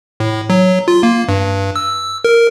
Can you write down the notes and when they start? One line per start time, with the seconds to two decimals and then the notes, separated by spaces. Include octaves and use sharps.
0.20 A2
0.50 F#3
0.88 F4
1.03 A#3
1.28 G2
1.76 E6
2.25 A#4